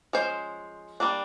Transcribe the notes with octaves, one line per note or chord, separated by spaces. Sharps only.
F3 G#3 C#4 C5
G3 A#3 D4